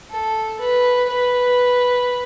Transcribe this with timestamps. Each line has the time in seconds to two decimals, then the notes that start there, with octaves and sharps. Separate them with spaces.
0.10 A4
0.60 B4
1.09 B4